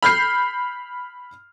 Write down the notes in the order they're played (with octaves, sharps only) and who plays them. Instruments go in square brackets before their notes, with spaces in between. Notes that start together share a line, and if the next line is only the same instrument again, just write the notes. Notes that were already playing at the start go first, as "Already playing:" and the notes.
[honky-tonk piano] B5 F6 G6 C7